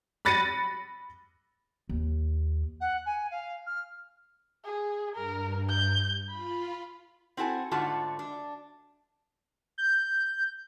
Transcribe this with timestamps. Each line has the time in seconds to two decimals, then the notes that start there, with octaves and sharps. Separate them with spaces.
0.25 B5 F#6 A6 A#6 C#7 D#7
1.89 D#2
2.80 F#5
3.06 G#5
3.31 F5
3.66 F6
4.65 G#4
5.15 G2 A#4
5.70 G6
6.30 F4 B5
7.37 C4 E4 F#4 A4 G#5
7.71 G#2 D3 A3 F4 F#4 A5
8.19 D4
9.78 G6